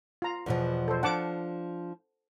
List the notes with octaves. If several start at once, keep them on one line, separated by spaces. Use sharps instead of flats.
F4 A#5
E2 B2 F3
A4 C5
F3 D4 F#5 A5 D6